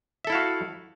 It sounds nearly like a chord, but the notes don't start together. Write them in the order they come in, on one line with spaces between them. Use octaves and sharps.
E5 A4 E4 F5 F#4